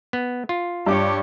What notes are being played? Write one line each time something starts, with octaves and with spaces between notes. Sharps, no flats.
B3
F4
G2 G4 C#5 D6